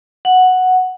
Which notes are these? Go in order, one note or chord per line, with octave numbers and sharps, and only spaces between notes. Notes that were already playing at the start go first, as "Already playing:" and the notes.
F#5